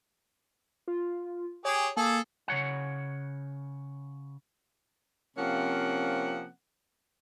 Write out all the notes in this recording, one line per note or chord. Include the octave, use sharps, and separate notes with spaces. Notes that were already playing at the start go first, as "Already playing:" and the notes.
F4
G4 G#4 C#5
A#3 G#4 A4
C#3 C#5 F#5
C3 F3 A#3 C4 C#4 F#5